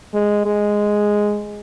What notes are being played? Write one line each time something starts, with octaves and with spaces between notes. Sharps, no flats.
G#3
G#3